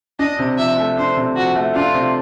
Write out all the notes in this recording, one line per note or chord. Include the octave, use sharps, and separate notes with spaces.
D4 D#5
C3
F3 E5
A3
D4 C5
C3
F3 F#4
A3
D4 F4
C3